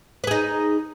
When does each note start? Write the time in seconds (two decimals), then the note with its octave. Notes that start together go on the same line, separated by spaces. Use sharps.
0.24 B4
0.27 G#4
0.31 D#4